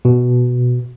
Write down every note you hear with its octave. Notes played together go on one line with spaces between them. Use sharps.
B2